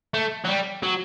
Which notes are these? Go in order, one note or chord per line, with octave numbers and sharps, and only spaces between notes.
A3
F#3
G3
F#3